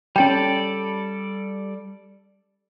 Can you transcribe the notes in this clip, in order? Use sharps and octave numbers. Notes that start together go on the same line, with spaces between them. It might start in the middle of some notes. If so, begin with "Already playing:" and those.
G3 C#4 A4 D5 G5